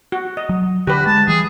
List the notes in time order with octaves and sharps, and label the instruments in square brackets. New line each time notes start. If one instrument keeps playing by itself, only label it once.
[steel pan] F#4
D#5
[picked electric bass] F#3
[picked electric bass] D3 [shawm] F#4 [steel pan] G4 B4
[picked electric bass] G#3 [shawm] A5
[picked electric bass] E3 G3 [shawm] G#4